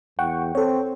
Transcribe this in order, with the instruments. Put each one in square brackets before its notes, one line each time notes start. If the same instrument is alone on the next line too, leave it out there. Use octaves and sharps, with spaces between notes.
[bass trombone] E2 [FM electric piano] F#5 G5 C#6
[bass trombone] C4 [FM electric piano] A4 C#5